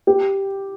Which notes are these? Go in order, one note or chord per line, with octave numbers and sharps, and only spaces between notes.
G4